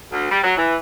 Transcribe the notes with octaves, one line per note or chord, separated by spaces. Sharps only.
D2
G3
F#3
E3